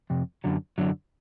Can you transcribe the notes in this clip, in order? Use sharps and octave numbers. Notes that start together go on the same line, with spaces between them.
F2 C3
F#2 D3 F#3
F#2 D3 F#3